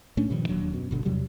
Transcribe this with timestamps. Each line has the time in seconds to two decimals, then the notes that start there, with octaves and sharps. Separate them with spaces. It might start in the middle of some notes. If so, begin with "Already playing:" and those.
0.17 A2 A3 C#4 D4
0.30 G2 A#2 D#3 F3
0.48 E1 D#2 F#3 D4
0.74 F#2 B2
0.91 G1 B2 D3
1.05 E2 C3 F#3 G3